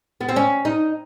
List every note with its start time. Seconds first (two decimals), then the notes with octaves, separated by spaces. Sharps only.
0.21 B3
0.29 C4
0.36 C#4
0.65 D#4